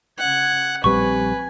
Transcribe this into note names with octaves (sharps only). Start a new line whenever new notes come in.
C#3 F#5 G#6
A#1 G3 C4 B4 G#5 C#6